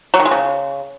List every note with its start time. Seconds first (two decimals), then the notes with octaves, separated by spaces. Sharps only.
0.14 F#3
0.20 D#3
0.25 G#3
0.31 C#3